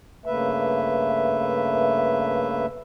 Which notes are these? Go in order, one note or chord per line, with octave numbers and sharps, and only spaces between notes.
G2 C#3 A3 A#3 B4 E5